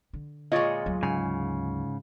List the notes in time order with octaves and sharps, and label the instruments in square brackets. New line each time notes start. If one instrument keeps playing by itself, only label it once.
[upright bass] D3
[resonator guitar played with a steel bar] A#2 C#5 D#5 [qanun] G#3 F4
[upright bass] D2 F#3
[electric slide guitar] G#2 C#3 [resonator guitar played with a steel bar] G#5